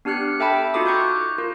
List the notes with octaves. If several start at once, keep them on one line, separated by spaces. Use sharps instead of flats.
B3 D4 G4 F6 F#6 C#7
A4 E5 G5 A5 B5
D#4 F4 F#4 A4 D6 D#6
A#5 C#6 F#6 G6
F4 A#4